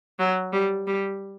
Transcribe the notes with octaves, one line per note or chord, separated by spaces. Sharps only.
F#3
G3
G3